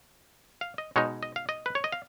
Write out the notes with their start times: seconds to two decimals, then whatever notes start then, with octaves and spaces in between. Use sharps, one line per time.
0.61 F5
0.78 D#5
0.96 B2 G#3 D#4 C#5
1.23 D#5
1.36 F5
1.49 D#5
1.66 B4
1.75 C#5
1.84 D#5
1.92 F5